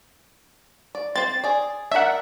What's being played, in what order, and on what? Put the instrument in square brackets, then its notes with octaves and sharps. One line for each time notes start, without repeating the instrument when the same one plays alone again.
[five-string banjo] D5
[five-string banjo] C4 C5 [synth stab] A6
[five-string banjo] G#4 D5
[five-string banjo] D4 A#4 [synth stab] E5 F#5